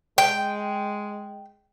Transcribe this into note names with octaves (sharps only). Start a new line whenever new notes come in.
G#3 G5